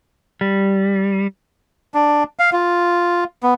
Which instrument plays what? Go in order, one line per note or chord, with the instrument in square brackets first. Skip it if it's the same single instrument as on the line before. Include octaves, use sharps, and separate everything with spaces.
[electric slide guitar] G3
[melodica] D4
F5
F4
B3